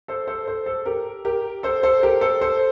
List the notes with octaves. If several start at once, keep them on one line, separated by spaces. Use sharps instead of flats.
A4 C5
A4 C5
A4 C5
A4
G4 A#4
G4 A#4
A4 C5
A4 C5
G4 A#4
A4 C5
A4 C5